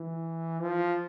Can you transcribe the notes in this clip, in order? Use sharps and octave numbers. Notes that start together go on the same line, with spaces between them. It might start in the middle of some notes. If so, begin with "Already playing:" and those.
Already playing: E3
F3